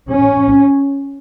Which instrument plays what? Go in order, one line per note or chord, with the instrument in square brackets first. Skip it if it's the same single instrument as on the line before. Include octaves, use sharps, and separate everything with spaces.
[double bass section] C#4